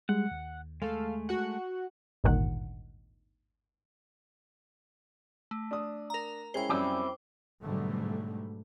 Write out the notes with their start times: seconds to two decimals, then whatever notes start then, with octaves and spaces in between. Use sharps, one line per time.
0.09 G3 G#3 F#5
0.31 D#2
0.82 G#3 A3 A4 F5
1.29 F#4 F#5
2.24 G#1 D2 G2 A#2 D#3 F#5
5.51 A3
5.71 D4 D#6
6.10 A#4 A#5
6.54 G#3 C#4 E4 C5 G5
6.69 F#2 G3 C4 C#4 E4 G4
7.63 G#2 B2 D3 F#3 G3 A3